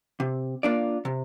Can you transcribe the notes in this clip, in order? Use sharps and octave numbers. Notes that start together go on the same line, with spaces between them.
C3
A#3 D4 F4 D5
C3